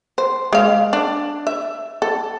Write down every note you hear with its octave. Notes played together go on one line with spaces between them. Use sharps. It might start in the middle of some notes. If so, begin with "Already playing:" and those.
C5
G#3 F5
D4
E5
A4